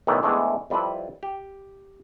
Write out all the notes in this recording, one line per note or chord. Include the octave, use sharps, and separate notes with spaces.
B1 A2 D#3 E3 D5 E5
E2 E3 G#3 A3 C4 D4
F2 G3 C4 E4 B4 A5
G4